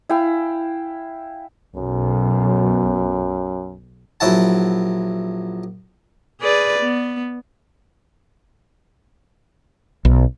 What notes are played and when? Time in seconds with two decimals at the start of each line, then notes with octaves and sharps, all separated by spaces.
0.09 E4 F5 G5 G#5
1.76 B1 F#2
4.20 A#1 F#3 E4 F#5 A5
6.41 G#4 B4 D5
6.80 B3
10.05 B1